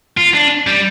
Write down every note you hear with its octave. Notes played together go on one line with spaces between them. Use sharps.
F4
D4
G3